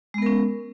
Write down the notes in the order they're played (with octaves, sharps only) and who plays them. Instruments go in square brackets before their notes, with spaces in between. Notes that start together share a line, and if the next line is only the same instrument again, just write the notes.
[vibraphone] G#3
B3
A#4
C#4